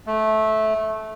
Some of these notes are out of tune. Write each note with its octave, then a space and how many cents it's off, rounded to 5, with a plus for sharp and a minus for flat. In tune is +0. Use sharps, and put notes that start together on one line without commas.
A3 -15